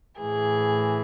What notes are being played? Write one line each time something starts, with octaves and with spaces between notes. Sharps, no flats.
A2 E3 G#4